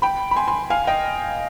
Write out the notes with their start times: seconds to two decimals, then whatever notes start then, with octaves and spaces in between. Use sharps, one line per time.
0.02 G5 B5
0.31 B5
0.36 G#5 C6
0.48 G#5 C6
0.70 F5 G#5
0.87 D#5 G5